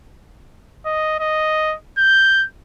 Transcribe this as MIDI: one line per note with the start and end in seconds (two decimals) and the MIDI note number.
0.86 1.17 75
1.20 1.76 75
1.98 2.46 91